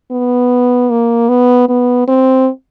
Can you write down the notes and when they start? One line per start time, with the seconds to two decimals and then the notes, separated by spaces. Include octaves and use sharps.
0.11 B3
0.91 A#3
1.29 B3
1.69 B3
2.08 C4